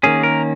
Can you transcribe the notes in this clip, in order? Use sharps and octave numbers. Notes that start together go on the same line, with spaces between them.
D#3 A#3 C#4 G#4
A#4